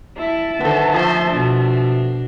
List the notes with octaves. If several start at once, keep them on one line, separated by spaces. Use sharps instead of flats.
E4 E5 A5
D3 D#3 B3 A4 C5
F3 A3 C5
B2 D4